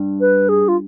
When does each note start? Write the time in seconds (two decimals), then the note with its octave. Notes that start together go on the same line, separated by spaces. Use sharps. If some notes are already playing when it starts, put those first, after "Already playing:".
Already playing: G2
0.20 B4
0.49 G#4
0.68 F4